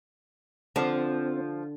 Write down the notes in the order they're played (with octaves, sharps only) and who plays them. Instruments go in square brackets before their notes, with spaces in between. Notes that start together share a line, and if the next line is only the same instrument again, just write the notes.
[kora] D3 D4 F5 [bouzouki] F3 [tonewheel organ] C4